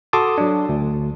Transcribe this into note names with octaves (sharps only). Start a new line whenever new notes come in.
F#4 A4 A5 C6 D6 D#6
F#3 D4
D2